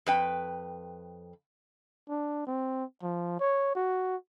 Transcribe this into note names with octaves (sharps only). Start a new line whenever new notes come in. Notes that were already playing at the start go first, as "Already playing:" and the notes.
F2 B4 G5
D4
C4
F3
C#5
F#4